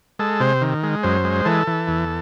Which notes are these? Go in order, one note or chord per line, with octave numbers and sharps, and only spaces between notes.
G#3 A4
C3 C5
D#3
G#3
F#2 C5
G#3
E3 A4
E3
E2